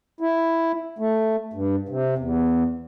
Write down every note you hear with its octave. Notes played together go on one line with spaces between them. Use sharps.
E4
A3
G2
C3
E2